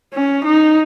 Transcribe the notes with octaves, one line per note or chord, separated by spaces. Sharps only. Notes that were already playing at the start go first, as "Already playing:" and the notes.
C#4
D#4